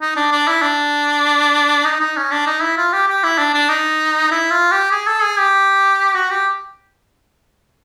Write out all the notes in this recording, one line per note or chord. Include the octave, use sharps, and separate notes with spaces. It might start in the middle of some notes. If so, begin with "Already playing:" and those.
D#4
D4
D4
E4
D4
D#4
D#4
C#4
D4
D#4
E4
F4
G4
G4
E4
D4
D4
D#4
E4
F4
G4
G#4
A4
G#4
G4
F#4
G4